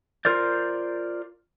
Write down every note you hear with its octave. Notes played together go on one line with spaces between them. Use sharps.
F4 A#4 C5 D5